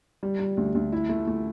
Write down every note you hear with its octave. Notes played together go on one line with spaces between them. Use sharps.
G3
G3
D2
D2
E4
A3
A3